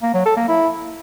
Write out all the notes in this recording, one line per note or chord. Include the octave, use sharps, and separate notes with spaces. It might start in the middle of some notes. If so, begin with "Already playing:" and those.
A#3
F#3
A4
A#3
E4